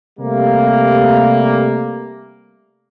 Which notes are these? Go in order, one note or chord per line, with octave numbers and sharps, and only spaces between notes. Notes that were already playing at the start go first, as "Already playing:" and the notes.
C3 G3 A3 A#3